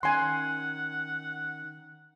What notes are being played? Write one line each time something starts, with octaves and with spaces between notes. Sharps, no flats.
D#3 C#4 F#5 G#5 C6